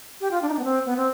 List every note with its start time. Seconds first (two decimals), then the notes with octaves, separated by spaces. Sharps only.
0.21 G4
0.31 F4
0.42 D4
0.49 D#4
0.53 D4
0.59 B3
0.64 C4
0.86 B3
0.97 C4